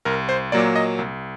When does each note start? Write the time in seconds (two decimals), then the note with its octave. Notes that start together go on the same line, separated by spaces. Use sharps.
0.05 C2 A#4
0.29 C5
0.52 A#2 F#3 A#3 D5
0.76 D#5
0.98 C2